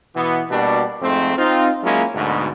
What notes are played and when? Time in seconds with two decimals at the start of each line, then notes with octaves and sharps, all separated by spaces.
0.16 B2 E3 B3
0.50 B2 G3 A#3 D4 F#4 G4
1.02 F2 G#2 A3 C4
1.37 C4 D#4 F4
1.83 F#3 G#3 A#3 C#4 E4 F4
2.15 D2 G#2 B2